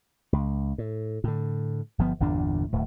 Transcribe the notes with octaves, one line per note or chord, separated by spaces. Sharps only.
C#2
A2
A2 D3
G1 F3 B3
G1 E2 A#2 D4
D1 A2